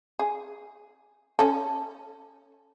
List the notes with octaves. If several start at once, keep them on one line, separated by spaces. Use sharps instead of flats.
G#4
C#4 A4